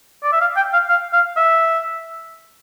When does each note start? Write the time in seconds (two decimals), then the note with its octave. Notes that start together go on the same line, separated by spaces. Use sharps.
0.23 D5
0.32 E5
0.41 F5
0.57 G5
0.73 F5
0.89 F5
1.13 F5
1.37 E5